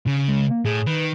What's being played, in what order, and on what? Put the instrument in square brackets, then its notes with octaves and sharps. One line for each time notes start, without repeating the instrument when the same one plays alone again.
[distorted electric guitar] C#3
[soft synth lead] G#3
A#3
[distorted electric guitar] A2 [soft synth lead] G#4
[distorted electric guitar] D#3 [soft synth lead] B4